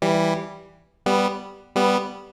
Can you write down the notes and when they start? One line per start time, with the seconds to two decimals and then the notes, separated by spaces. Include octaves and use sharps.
0.02 E3 G3
1.06 G3 B3
1.76 G3 B3